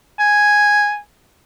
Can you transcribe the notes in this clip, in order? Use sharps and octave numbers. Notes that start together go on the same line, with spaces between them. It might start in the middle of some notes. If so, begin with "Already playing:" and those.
G#5